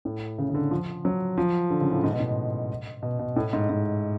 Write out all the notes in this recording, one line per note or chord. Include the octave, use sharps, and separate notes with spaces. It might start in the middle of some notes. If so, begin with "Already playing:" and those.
A2
C#3
C#3
D3
F3
F#3
F3
D3
C#3
A2
G#2
B2
A2
B2
B2
A2
G#2
G#2